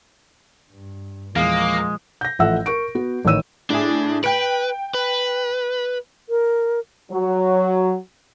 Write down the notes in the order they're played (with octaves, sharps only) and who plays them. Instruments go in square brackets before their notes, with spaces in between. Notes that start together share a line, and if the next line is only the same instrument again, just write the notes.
[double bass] G2
[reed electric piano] E2 F5 [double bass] A#2 F3 [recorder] G#3 [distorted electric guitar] A#3
[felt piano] G6 A#6
A1 F3 A4 E5 F#5 E6
A#4 C#6 D7
B3 F#4
A1 D#3 C#5 E6 D#7
[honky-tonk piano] A2 E4 G#4 [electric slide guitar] D4
[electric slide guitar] B4 [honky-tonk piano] G5 D7
[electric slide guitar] B4
[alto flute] A#4
[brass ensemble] F#3